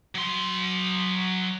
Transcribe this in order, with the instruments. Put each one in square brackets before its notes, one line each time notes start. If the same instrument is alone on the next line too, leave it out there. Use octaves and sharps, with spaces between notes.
[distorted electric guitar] F#3 C6